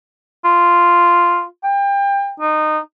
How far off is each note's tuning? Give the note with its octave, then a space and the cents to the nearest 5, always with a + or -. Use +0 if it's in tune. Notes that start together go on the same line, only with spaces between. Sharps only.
F4 -5
G5 +30
D#4 -20